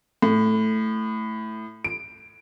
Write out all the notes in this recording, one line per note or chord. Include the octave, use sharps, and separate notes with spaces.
A2
D7